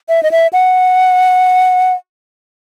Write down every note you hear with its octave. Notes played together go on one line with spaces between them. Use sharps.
E5
D#5
E5
F#5